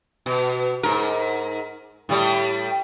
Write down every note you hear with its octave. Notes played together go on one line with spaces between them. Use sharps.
B2
G#2 A#4
A2 G3